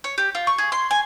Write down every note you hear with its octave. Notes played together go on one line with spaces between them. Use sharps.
C#5
G4
F4
C#6
G#4
C6
G#5